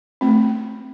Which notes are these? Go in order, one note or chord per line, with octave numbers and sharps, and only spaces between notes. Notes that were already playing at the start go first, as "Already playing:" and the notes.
A3 C4